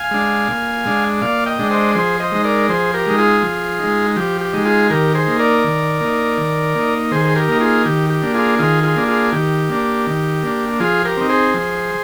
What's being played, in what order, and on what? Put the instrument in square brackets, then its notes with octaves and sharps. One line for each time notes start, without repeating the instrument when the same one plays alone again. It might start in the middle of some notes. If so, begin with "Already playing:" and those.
Already playing: [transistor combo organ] F5 G#5
G#3 D4
A#2
G#3 D4
A#2 D5 F5
D#5 G5
G#3 D4
C5 D#5
F3 G#4 C5
C5 D#5
G#3 D#4
A#4 D5
F3 G#4 C5
G4 A#4
G#3 D#4
F4 G#4
F3
G#3 D#4
F3 G4
G4
G#3 D#4
F4 G#4
D#3 G4 A#4
G#4 C5
A#3 D#4
A#4 D5
D#3
A#3 D#4
D#3
A#3 D#4
D#3 G#4 C5
G#4
G4 A#4
A#3 D#4
F4 G#4
D#3 G4
G4
A#3 D4
F4 G#4
D#3 F4 G#4
F4 G#4
A#3 D4
F4 G#4
D#3 G4
A#3 D4
D#3
A#3 D4
F3 F4 G#4
G4 A#4
C4 D#4
G#4 C5
F3